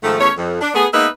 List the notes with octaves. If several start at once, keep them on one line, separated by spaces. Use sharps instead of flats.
G#2 D#3 F3 A3
E2 A3 C#4 C#5
F2
D4
A3 B3 G#4
G#3 A#3 B3 D#4 B4 E5